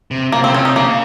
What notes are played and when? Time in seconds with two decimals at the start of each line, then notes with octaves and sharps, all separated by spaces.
0.11 C3
0.32 C3 A#3
0.44 C#3 C4
0.54 C3 C#4
0.65 D#4
0.76 C#3 A#3